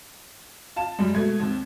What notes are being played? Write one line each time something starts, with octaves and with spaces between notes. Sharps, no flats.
F4 A5 E7
F#2 G3 G#3
B2 A3 G#6
D#2 C4